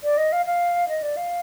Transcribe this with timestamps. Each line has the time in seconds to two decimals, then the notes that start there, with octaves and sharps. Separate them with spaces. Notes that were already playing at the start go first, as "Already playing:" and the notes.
0.04 D5
0.18 D#5
0.32 F5
0.46 F5
0.89 D#5
1.02 D5
1.17 F5